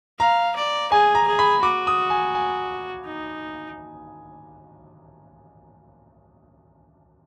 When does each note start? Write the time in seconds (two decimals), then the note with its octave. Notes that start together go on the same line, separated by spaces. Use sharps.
0.19 F5 A#5
0.56 D5
0.92 G#4 G#5
1.15 A#5
1.27 G#4
1.39 B5
1.62 F#4 D6
1.87 D#6
2.10 G#5
2.35 G#5
3.05 D#4